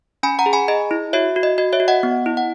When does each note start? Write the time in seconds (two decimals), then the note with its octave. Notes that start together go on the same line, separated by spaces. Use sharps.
0.23 C#4 G#5 B5
0.39 F#5 A#5
0.46 G#4
0.53 G#5 B5
0.68 G#4 D#5
0.91 E4
1.13 F#4 C#5 E5
1.36 F#4
1.43 D#5
1.58 F#4 D#5
1.73 C#5 E5
1.80 F#4
1.88 D#5 F#5
2.03 B3
2.26 E4
2.37 F#5